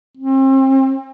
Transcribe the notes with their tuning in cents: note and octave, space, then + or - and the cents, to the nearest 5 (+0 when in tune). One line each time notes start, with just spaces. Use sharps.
C4 +40